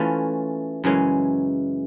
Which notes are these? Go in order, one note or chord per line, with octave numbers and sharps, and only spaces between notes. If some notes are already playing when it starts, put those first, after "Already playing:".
Already playing: E3 A3 C#4 F4
F#2 C#3 E3 G#3 C#4